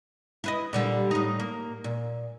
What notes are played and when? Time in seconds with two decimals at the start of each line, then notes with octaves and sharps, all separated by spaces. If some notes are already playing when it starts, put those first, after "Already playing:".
0.44 E4 B4 D#5
0.73 A#2 D3 G3
1.11 A2 D#4
1.39 A#3
1.84 A#2